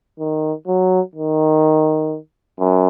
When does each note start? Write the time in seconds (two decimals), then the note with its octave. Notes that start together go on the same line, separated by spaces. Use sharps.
0.19 D#3
0.67 F#3
1.15 D#3
2.60 F#2